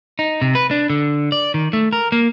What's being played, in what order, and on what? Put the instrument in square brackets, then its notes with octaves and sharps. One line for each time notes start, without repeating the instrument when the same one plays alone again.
[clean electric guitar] D#4
C3
B4
D4
D3
D5
D#3
A3
A#4
A#3